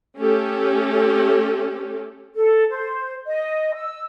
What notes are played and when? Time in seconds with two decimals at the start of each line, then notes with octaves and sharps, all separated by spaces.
0.19 A3 C#4 G4 A4
2.35 A4
2.70 C5
3.26 D#5
3.74 E6